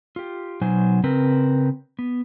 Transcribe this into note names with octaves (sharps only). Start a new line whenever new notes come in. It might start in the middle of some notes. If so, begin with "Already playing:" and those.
F4 G4
B2 F#3 D#4 C5 G#5
C#3 C4 A#4 B4
B3